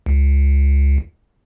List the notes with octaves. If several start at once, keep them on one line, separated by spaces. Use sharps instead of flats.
C#2